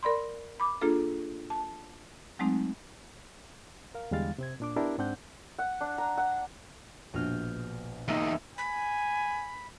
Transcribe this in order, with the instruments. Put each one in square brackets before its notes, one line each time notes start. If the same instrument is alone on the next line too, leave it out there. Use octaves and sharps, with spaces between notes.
[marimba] A#4 D5 B5 C6
B5 D6
A#3 D4 F4 G#4 A4
A5
F#3 G#3 A3 C4 D#4
[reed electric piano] A#4 F5
E2 D3 G3 G#3 F5 A6
C3 C4 G#6
A#2 D4 D6
B3 D4 E4 G4 A#4
G#2 C4 D4 F#5 G6
[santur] F#5
D4
A#5
F#5
[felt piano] A#1 [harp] B2 F6 G6
[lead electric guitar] E2 D#4 [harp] A#3 E5 F5
[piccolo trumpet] G#5 [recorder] B5